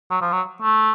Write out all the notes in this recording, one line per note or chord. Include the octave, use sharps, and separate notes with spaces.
F#3
F3
F#3
A3